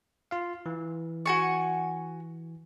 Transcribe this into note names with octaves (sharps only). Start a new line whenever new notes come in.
F4 F5
E3
F#4 G#5 C#6